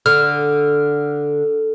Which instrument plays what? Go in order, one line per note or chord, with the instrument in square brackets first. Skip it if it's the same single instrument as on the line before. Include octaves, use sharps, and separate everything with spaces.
[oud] D3 [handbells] F6